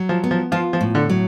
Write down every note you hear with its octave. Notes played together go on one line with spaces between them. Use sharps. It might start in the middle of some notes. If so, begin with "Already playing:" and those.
Already playing: F#3
F3
B3
F3
F3 F4
F3
A2
D3
F#3